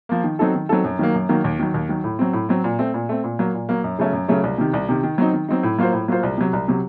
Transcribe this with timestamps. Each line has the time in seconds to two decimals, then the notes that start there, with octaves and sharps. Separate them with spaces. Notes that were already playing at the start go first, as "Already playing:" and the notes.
0.09 F3 A#3
0.24 D#3
0.39 F#3 C4 D#4 A4
0.55 D#3
0.69 F#3 C4 D#4 A4
0.84 F#2
0.99 D#3 F#3 A#3
1.14 F#2
1.29 D#3 F#3 A#3
1.44 D#2
1.59 D#3 F#3
1.74 D#2
1.89 D#3 F#3
2.04 A2
2.19 F#3 C4
2.33 A2
2.49 F#3 C4
2.64 A#2
2.79 A3 C4
2.94 A#2
3.09 A3 C4
3.24 A#2
3.39 F#3 A#3
3.54 A#2
3.69 F#3 A#3
3.84 F#2
3.99 C#3 F#3 A3 C#4
4.13 F#2
4.28 C#3 F#3 A3 C#4
4.44 C2
4.58 C3 D#3
4.73 C2
4.89 C3 D#3
5.03 D#3
5.18 F#3 C4 D#4
5.33 D#3
5.49 F#3 C4 D#4
5.63 A2
5.79 F#3 A#3 F4 C5
5.93 A2
6.08 F#3 A#3 F4 C5
6.23 C2
6.38 C3 F#3
6.53 C2
6.68 C3 F#3